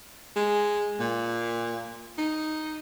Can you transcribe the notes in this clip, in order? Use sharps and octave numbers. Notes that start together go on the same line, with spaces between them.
G#3
A#2
D#4